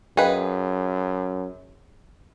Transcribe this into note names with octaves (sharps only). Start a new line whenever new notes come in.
F#2 G#4 B4 D#5 F5 G5